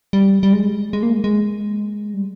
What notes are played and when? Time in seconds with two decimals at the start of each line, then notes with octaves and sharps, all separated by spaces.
0.13 G3
0.43 G3
0.53 G#3
0.93 G#3
1.03 A#3
1.13 G#3
1.24 G#3
2.14 G3